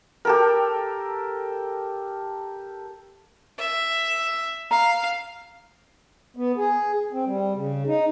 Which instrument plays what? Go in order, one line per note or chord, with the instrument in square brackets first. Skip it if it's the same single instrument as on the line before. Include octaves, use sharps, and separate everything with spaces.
[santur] G4 A4 A#4
[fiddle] E5
[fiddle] F5 [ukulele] A#5
[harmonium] B3
G#4
C4
G3
C#3
D#4